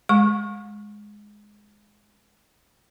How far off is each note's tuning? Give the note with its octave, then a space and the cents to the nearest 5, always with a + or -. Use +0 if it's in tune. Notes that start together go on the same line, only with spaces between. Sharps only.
G#3 +0 C#6 -20